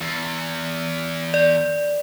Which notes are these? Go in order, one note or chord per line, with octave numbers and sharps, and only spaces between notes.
E2
D5